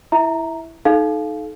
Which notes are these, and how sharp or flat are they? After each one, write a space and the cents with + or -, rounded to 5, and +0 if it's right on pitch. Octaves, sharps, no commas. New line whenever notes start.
E4 +0 E5 -15 A#5 +0
D#4 +0 A4 -30 F5 +0